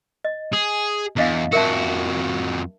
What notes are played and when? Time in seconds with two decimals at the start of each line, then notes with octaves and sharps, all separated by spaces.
0.24 D#5
0.53 G#4
1.17 E2 D4 D#5 F5
1.53 F2 F#4 A#4 E5 A5